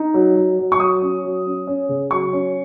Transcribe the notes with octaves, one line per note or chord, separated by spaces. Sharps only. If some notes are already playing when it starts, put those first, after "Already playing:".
Already playing: D#4
F#3
F#3
F#3
C#6
F#3 D#6
C#4
F#3
C#4
C#4
C#3
F#3 C#6
C#4